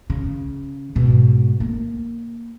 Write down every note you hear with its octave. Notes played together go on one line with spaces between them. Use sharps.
C#3
G#2 B2
A#3